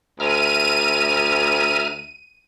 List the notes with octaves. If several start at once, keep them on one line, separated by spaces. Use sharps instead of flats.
D2 E5 A#5 F6 D#7